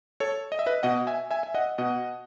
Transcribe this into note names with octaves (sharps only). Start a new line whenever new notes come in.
A4 C#5
D#5
E5
B4 D#5
B2 D#5 F#5
E5 G#5
E5 G#5
E5
D#5 F#5
B2 D#5 F#5